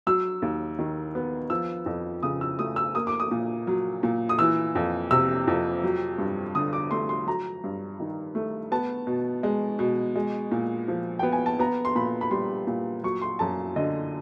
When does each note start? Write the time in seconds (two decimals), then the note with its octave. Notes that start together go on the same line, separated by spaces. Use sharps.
0.07 F#3 E6
0.42 D#2
0.79 D#3
1.15 B3
1.50 F3 E6
1.86 F2
2.23 C#3 D#6
2.41 E6
2.59 A3 D#6
2.76 E6
2.95 A#3 D#6
3.07 D6
3.20 D#6
3.31 A#2
3.67 F#3
4.03 A#2
4.29 D#6
4.39 E3 E6
4.75 F2
5.11 C3 E6
5.47 F2
5.84 F#3
6.18 G2
6.55 D3 D#6
6.73 D6
6.91 A3 C6
7.09 C6
7.27 F#3 A#5
7.64 G2
8.00 D#3
8.35 A3
8.72 B3 A5
9.07 B2
9.43 G#3
9.79 B2
10.16 G#3
10.52 A#2
10.88 F3
11.19 B3 G5
11.33 G#5
11.46 A5
11.59 B3 A#5
11.85 C6
11.95 A#2 B5
12.21 B5
12.31 G3 C6
12.67 A#2
13.03 F#3 C#6
13.22 C6
13.39 F#2 A5
13.76 D3 D#5